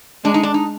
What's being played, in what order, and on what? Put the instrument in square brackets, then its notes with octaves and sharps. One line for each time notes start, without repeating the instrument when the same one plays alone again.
[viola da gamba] G#3 [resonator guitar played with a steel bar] D4
[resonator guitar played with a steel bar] D#4
D4
D#4